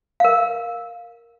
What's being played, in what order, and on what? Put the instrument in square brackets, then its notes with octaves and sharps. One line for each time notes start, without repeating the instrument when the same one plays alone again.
[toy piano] A#4 F5